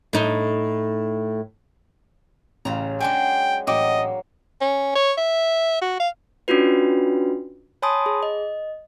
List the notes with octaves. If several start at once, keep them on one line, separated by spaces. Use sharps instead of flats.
A2 D#4
A1 C#3 F5 A#5
F#3 G#3 D4 G5 G#5
A1 F#3 A#3 D#5 G5 D6
C#4
C#5
E5
F#4
F5
C#4 D4 F4 F#4 B4
C#5 G#5 A5 B5 C6 D#6
G#4
D#5